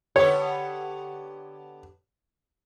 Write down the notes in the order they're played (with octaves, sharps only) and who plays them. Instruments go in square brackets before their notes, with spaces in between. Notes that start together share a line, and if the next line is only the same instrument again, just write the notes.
[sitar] D3 B3 G4 [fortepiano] C#5